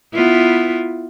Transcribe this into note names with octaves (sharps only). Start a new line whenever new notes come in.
B3 E4 F4